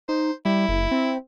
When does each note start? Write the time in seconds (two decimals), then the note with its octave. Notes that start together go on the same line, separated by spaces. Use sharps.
0.09 D#4 C5
0.45 G3 E4
0.69 F#1
0.91 C4